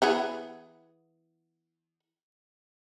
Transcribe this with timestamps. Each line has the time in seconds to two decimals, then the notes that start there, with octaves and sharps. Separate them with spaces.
0.02 E3 B3 G#4